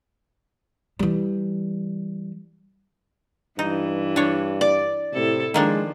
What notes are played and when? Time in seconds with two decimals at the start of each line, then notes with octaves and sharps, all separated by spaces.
0.99 E3 G3
3.59 G2 E3 D#4
4.16 D4 C#5
4.61 D5
5.13 A2 C3 E4 A4
5.54 D#3 F3 G#3 A#3 D4